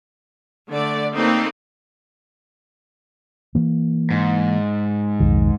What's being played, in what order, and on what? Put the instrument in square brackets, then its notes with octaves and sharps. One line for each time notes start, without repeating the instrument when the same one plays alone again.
[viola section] D3 A3 D5
A#3 C4 D#4 A4 B4
[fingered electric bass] E3 A#3
[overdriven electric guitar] G#2
[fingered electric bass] B1 F2 D#3